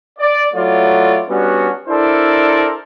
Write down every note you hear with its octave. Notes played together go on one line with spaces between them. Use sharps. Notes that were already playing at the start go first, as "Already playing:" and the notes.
D5
F#3 A3 E4 F4 C#5 D5
G3 B3 C#4 D4 F#4
D4 E4 A4 A#4 C5 D5